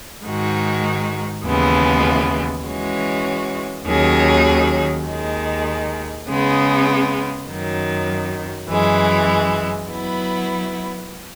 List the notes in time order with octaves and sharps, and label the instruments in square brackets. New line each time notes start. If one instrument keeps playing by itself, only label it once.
[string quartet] G#2 D#3 G#3 D#4 F#4
D#2 C#3 E3 G#3 B3
E3 G#3 C#4 F#4
D#2 D#3 F#3 C#4 G#4
D#2 D#3 G#3
C#3 G#3 B3
F#2 D#3 F#3
F#2 E3 G#3
F#3 B3 E4